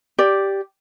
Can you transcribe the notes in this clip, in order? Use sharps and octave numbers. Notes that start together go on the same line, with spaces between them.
G4 D5